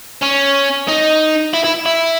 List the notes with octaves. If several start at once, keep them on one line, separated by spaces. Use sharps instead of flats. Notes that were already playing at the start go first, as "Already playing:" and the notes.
C#4
D#4
E4
E4
E4